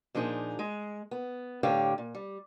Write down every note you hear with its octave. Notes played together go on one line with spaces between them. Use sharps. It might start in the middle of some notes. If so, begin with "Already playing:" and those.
A#2 F3 D4 D#4 G#4
G#3
B3
A2 D3 G4 C#5 F5 G5
A#2
G3